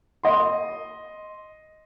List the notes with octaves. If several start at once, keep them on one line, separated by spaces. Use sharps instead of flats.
D#5 C6